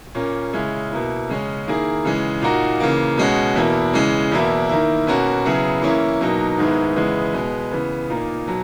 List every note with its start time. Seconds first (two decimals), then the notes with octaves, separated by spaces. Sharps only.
0.15 A#2 A#3 C#4
0.53 C#3 G#3 C#4 E4
0.91 B2 A#3 E4
1.29 C#3 G#3 C#4
1.67 D#3 A#3 E4 G#4
2.04 C#3 E3 G#3
2.42 A#2 A#3 D#4 F#4
2.80 C#3 E3 A#3
3.17 B2 G#3 C#4 F#4
3.55 E2 B2 A#3 E4
3.94 C#3 E3 G#3
4.31 E2 B2 A#3 E4
4.69 D#3 A#3 E4
5.07 B2 A#3 C#4 F#4
5.45 C#3 F#3 B3 E4 G#4
5.82 E3 A#3 C#4 E4
6.21 B2 F#3 A#3 D#4
6.58 G#2 D#3 G#3 B3 E4
6.96 E2 C#3 G#3 B3 E4
7.33 B2 G#3 B3
7.71 C#3 E3 B3
8.09 A#2 A#3 D#4
8.47 B2 F#3